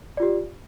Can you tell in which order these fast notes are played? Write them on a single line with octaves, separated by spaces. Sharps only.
D5 F4 G4